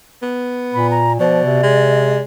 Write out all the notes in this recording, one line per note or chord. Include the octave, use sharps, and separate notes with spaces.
B3
A#2 B5
A#5
B2 F3 D5
C3
G#3